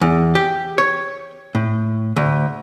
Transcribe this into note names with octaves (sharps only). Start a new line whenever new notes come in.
E2
G4
C#5
A2
D2